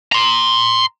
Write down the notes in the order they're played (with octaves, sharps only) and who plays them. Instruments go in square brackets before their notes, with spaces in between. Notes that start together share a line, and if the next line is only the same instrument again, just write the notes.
[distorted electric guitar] A#5 C6